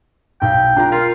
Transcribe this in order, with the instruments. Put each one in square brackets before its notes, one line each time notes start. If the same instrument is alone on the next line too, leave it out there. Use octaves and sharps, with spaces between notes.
[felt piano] B1 [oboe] G5
[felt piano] D4 F4 A#5
[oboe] F4 [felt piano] A#4